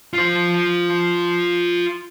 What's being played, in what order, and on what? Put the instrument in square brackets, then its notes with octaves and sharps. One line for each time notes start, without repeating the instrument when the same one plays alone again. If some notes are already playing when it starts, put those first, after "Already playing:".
[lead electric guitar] F4 C5